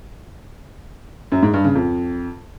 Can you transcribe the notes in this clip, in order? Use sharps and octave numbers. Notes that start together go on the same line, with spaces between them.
F#2
G#2
G2
C#3
F2